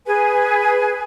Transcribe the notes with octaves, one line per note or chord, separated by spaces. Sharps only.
G#4 B4 G#5